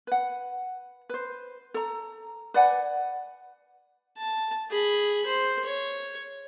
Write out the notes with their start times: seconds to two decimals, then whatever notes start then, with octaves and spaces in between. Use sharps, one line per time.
0.07 B4 F#5
1.09 B4 C5
1.74 A4 A#5
2.54 B4 D5 F#5 G#5
4.18 A5
4.70 G#4 B5
5.26 C5
5.64 C#5